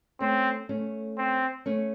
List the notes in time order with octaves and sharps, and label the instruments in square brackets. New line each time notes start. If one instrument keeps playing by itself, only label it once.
[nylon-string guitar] A3 C#4 [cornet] C4
[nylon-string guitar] A3 C#4
[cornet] C4
[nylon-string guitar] A3 C#4